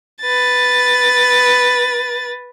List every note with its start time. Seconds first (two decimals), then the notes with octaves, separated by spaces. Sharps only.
0.21 B4 A6